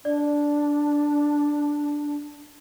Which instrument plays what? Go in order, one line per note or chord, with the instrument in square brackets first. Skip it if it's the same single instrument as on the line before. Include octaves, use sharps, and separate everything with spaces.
[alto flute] D4 [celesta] D5